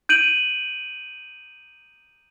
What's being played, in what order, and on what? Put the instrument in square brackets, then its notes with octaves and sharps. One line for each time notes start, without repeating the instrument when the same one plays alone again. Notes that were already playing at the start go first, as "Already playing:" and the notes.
[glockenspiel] G6 D7 D#7 F#7